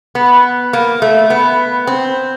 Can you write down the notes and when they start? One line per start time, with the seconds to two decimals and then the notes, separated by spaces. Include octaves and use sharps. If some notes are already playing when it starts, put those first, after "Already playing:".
0.15 B3
0.73 A#3
1.02 A3
1.30 B3
1.87 C4